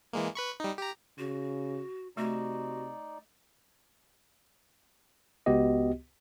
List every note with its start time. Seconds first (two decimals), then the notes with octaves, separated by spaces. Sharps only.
0.13 E3 G#3 A#3
0.35 B4 B5 C#6
0.60 G3 D#4
0.78 G4 A#5
1.18 C#3 F#4
2.17 C3 A3 D#4 F#4 D5
5.46 C#2 B3 F#4 G4 D#5